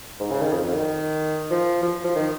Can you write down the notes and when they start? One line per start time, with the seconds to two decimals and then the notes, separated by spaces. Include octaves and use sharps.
0.20 G#2
0.31 C#3
0.42 D#3
0.53 F2
0.64 F2
0.74 D#3
1.51 F3
1.83 F3
2.04 F3
2.16 D#3